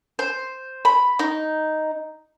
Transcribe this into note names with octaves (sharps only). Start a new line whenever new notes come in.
C5
B5
D#4